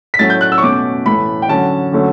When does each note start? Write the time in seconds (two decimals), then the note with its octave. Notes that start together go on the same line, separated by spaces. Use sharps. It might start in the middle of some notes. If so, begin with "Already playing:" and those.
0.14 B6
0.19 A2 F#3 A3 C#4 A6
0.30 G6
0.41 F#6
0.52 E6
0.58 C#6
0.62 B2 A3 C#4 D6
1.06 A2 E3 A3 B5
1.42 G5
1.49 D3 F#3 C#4 A5
1.92 D3 F#3 A3 C#4